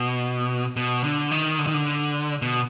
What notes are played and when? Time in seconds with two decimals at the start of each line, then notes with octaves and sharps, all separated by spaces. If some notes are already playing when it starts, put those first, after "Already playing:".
Already playing: B2
0.76 B2
1.04 D3
1.31 D#3
1.59 D3
1.67 D#3
1.74 D3
2.42 B2